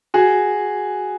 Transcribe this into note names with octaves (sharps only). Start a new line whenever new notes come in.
F#4 G#4